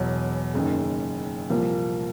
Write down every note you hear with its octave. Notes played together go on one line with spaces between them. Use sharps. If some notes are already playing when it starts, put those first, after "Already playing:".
Already playing: E1 E2 B2 F#3
F#1 F#2 D#3
C2 A#2 F3 A#3